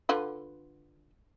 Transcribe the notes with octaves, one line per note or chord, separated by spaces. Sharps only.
D3 F4 B4